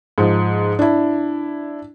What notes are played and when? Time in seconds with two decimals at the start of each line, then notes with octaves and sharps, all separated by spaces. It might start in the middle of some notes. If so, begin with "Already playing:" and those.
0.18 G#2 F3
0.79 D4 E4